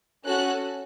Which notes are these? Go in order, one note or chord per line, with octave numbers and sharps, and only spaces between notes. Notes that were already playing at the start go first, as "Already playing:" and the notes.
C#4 F#4 A4 F#6